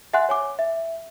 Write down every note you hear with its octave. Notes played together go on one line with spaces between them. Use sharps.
E5 F#5 G#5 C6 F#6
C#5 G#5 D6
E5